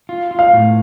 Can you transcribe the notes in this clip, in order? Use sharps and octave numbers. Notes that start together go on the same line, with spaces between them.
F4
F4
F5
A2